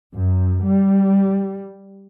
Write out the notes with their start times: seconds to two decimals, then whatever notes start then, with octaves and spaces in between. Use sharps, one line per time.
0.16 F#2
0.65 G3